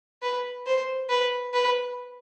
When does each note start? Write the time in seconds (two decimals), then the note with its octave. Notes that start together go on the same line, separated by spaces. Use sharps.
0.22 B4
0.66 C5
1.10 B4
1.54 B4